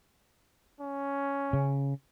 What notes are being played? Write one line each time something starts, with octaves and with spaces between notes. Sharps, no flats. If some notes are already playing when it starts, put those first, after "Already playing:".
C#4
C#3